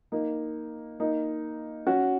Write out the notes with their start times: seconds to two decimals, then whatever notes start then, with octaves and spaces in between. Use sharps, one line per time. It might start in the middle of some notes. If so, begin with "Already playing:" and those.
0.12 A#3 D#4
1.00 A#3 D#4
1.87 C#4 F#4